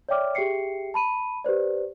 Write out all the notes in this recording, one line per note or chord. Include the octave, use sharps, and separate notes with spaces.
C#5 D5 E5 G5 D6 F6
G4 G#4 E5 G5 C7 C#7
A5 B5 D#7
G4 B4 C5 D5